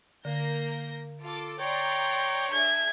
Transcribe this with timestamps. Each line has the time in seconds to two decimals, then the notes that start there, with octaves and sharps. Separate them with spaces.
0.25 D3 A#3 G6 A#6
1.21 F4 A4 D6
1.60 C#5 D5 G5 A#5 C6
2.52 D4 G#4 E5 G#6